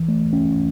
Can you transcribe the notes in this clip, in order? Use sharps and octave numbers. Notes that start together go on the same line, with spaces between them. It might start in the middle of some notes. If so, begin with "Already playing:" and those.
Already playing: E3
A3
C#4